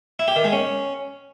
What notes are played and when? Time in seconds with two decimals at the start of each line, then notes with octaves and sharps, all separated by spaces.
0.19 E4
0.28 G4
0.36 D#3
0.44 G#3
0.53 C#4